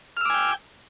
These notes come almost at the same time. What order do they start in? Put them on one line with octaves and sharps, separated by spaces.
F6 E6 D6 G#5 G5